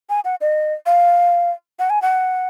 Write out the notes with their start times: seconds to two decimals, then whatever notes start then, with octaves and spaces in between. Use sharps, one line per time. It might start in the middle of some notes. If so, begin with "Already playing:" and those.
0.10 G#5
0.25 F#5
0.41 D#5
0.86 F5
1.79 F#5
1.90 G#5
2.02 F#5